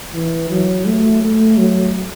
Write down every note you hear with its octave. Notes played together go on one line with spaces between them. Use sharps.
E3
F#3
A3
A3
F#3